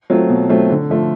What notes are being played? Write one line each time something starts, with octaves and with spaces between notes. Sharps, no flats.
F#3 A3 C4 F4
B2
F#3 A3 C4 F4
D3
F3 A3